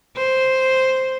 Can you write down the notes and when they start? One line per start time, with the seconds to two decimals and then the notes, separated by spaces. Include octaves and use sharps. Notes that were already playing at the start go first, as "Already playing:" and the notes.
0.17 C5